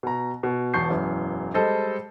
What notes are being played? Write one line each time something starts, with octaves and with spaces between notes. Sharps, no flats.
B2 A#5
B2
E1 E2 A5 C#6 G6 C7
E1 F#2 E3
G3 G#3 A4 C5 D#5